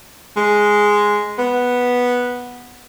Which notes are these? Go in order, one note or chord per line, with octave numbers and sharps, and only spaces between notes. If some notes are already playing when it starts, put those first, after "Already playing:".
G#3
B3